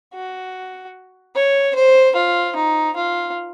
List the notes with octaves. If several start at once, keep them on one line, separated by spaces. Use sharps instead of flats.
F#4
C#5
C5
F4
D#4
F4